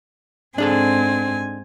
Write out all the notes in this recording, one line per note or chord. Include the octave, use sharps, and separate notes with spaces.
G#2 C4 D4 G#4 A4 G#5